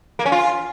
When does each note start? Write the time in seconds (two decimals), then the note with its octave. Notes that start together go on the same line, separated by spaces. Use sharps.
0.19 A#3
0.25 C#4
0.32 F4